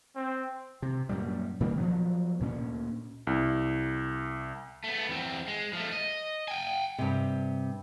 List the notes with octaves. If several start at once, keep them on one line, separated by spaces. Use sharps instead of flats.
C4
C3
F#2 A#2 G3
A#2 D#3 G3 A#3
F3 F#3 B3
D2 A#2 A3 C#4
C2
A3 B3
E2 C4
G#3
F3 A3
D#5
G5 G#5
G2 C3